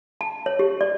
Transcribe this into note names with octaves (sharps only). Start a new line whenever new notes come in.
A5
C#5
G4
D5